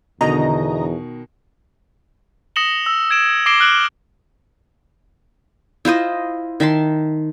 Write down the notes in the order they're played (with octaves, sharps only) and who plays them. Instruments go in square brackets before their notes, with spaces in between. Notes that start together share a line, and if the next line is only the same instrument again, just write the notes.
[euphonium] E2 [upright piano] B2 D#3 [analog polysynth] D3 D#5 A#5
[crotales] D#6 A#6 C#7 E7 F#7 G7
E6
G#6 D7 E7
D6 A#6 C7 D7 E7 G7
F6 F#6 D7 F#7
[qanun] E4 F4 C5 D#5
D#3 E5 A5 C6